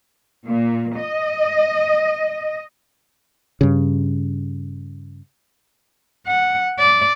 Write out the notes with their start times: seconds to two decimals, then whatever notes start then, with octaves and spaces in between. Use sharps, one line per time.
0.47 A#2
0.96 D#5
3.61 G2 C#3
6.27 F#5
6.79 D5